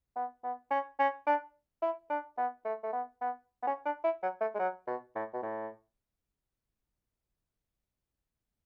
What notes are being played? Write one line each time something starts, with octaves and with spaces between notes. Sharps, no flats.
B3
B3
C#4
C#4
D4
E4
D4
B3
A3
A3
B3
B3
B3
C#4
D4
E4
F#3
A3
G#3
F#3
B2
A2
B2
A2